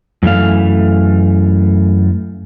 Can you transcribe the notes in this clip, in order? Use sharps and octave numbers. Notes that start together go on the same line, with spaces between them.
F#2 E3 A3 F5